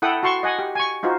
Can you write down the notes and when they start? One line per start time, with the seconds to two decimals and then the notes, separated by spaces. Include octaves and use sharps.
0.02 E4 A4 F#5 G5 D#6
0.23 F#4 A5 C6 C#6
0.43 D#5 F#5 G#5
0.59 G4
0.75 G#5 C#6
1.03 D#4 F4 F#4 C5